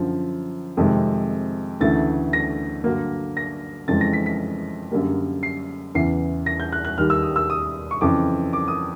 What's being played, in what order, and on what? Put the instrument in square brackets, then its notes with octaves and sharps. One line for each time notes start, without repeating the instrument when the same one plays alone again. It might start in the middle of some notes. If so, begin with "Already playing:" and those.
Already playing: [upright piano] F#2 D3 F3
F2 C3 D#3 G#3
D2 C#3 E3 A3 A6
A#6
G2 D3 F#3 A#3
A#6
F2 C#3 E3 G#3 A6
A#6
B6
B6
F#2 D3 G3 A#3
C7
E2 C#3 E3 C7
A#6
G6
F#6
F#6
D#2 D#3 G3 F6
E6
D#6
E6
D#6
C#6
F2 C#3 E3 D6
D6
D#6